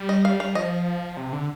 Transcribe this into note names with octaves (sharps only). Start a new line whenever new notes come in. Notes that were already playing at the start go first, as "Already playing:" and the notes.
Already playing: G3
D#5
F5
F5
F3 D#5
C3
D3